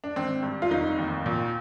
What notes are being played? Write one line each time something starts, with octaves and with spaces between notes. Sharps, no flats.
D4
G#1 C4
G2
F4
F1 D#4
D#2
A#2